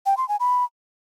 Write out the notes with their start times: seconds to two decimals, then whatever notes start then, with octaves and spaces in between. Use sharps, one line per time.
0.06 G5
0.17 C6
0.29 G#5
0.40 B5